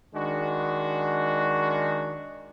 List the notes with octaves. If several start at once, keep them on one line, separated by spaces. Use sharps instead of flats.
D#3 G#3 D4 F#4